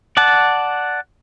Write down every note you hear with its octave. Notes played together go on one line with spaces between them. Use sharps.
D5 F#5 A5